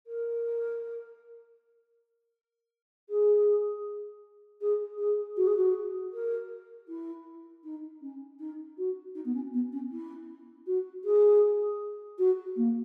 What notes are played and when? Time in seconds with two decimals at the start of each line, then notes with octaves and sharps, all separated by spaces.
0.07 A#4
3.09 G#4
4.61 G#4
4.99 G#4
5.37 F#4
5.47 G#4
5.56 F#4
6.13 A#4
6.88 E4
7.64 D#4
8.02 C#4
8.39 D#4
8.78 F#4
9.15 D#4
9.25 B3
9.34 C#4
9.54 B3
9.72 C#4
9.91 E4
10.67 F#4
11.04 G#4
12.18 F#4
12.56 A#3